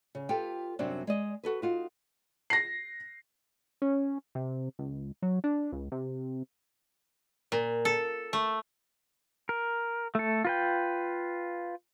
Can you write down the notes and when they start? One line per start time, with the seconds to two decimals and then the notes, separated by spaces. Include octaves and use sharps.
0.15 C#3
0.29 F4 G4 A4 B4 G5
0.79 F#2 C3 F#3 G3 C4 D4
1.07 G#3 D5 D#5
1.43 F#4 A4 B4
1.62 D#4 F4 F#4
2.50 A#6 C7
3.82 C#4
4.35 C3
4.79 C#2
5.22 F#3
5.44 D4
5.72 C#2
5.92 C3
7.52 A#2
7.85 A4
8.33 A3
9.49 A#4
10.15 A3 A4
10.45 F4 B4 G5